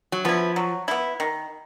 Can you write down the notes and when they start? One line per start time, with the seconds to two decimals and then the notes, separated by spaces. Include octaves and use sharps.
0.12 F#3
0.25 F3 B3 E4
0.56 F#3
0.88 B3 E4
1.20 D#3